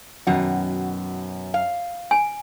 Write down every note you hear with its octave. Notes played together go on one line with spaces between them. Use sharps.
F#2 B2 D#3 F#5
F5
G#5